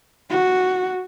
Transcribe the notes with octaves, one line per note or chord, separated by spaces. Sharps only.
F#4